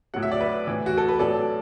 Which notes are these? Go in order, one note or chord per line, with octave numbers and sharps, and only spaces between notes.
A2 F#3 F#5
E5
D5
B4 E5
A2 E3
F#4
A4
B4
A2 F#3 A4 D5